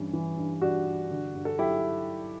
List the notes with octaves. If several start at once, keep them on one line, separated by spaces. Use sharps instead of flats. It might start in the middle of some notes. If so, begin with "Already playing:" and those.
Already playing: G2 E3 G3 C#4
E3
G2
G3 D4 F#4
G2
D3
G2
A4
F#3 E4 G4